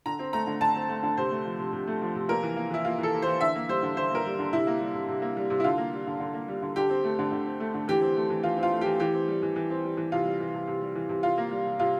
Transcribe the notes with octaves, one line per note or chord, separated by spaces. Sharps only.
D3 A#5
C4
A3 A#5
D3
D3 A5
C4
A3
D3
C3 C5
A3
F3
C3
C3
A3
F3
C3
A#3 A#4
E3
A#3
E3 E4
A#3 F4
E3
A4
A#3
C5
E3
D3 E5
A#3
G3 C5
D3
D3 C5
A#3 A#4
G3
D3
C3 E4
A#3
G3
C3
C3
A#3
G3
C3
E4
D3 F4
A#3
G3
D3
D3
A#3
G3
D3
D3 G4
C4
A3
D3
D3
C4
A3
D3
E3 G4
C4
A3
E3
E3 F4
C4
F4
A3
G4
E3
E3 G4
C4
G3
E3
E3
C4
G3
E3
C3 F4
G3
E3
C3
C3
G3
E3
C3
C3 F4
A#3
G3
C3
C3 F4